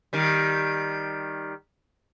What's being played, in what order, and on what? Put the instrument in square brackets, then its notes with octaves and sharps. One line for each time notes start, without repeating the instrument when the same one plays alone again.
[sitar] D#3 G3